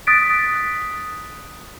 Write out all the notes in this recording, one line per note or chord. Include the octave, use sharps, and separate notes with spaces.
D#6 F#6 A6 B6 D7